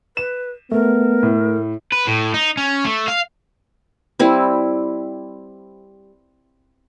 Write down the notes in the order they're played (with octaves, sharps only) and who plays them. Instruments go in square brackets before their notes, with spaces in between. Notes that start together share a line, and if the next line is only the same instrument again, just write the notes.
[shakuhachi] B4 [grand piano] E7
[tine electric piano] A3 [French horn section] B3 [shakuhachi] A#4
[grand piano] A2
[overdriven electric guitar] B4
A2
D#4
C#4
A3
F5
[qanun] G3 C4 E4